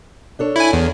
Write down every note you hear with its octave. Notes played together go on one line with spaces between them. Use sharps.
D4 A4 C#5
E4 G#5
E2